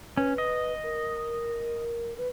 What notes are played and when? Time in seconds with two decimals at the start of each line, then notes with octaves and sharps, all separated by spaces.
0.17 C#4 B4
0.38 D#5
0.83 A#4
2.18 B4